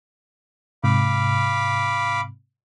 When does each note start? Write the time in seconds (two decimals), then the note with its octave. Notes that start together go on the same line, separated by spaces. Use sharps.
0.84 G#2 C3 F5 B5 D6